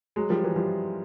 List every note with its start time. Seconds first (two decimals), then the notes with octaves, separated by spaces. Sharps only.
0.16 F#3 G#3
0.30 F3 G3
0.43 E3 F#3
0.56 F3 G3